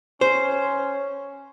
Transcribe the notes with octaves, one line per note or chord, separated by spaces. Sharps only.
C#4 C5